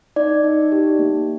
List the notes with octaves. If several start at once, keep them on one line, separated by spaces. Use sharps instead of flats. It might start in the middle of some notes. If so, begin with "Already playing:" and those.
D#4 D5
D#4
G4
A#3